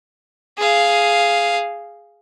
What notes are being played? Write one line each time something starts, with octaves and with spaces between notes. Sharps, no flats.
G#4 F5